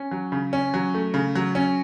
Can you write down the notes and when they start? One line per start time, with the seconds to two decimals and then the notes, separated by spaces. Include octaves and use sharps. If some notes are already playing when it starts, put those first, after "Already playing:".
Already playing: C#4
0.11 F#3
0.32 C#3
0.53 C#4
0.74 F#3
0.94 A3
1.14 C#3
1.35 F#3
1.55 C#4